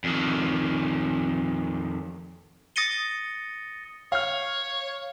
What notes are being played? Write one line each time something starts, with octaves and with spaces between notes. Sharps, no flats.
F2 D#3
D#6 A6 A#6 C#7 D#7 G7
C#5 F5 F6